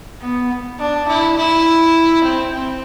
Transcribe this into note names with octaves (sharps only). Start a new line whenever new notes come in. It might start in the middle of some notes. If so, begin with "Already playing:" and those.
B3
D4
E4
E4
C4
C4